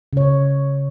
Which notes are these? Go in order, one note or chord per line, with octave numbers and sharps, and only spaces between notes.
C#3 C#5